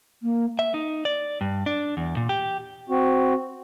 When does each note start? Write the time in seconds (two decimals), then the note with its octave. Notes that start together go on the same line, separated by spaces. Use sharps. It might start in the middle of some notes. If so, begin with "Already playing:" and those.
0.23 A#3
0.59 E5
0.74 D#4
1.05 D5
1.41 G2
1.66 D4
1.97 E2
2.17 A#2
2.29 G4
2.90 C4 F#4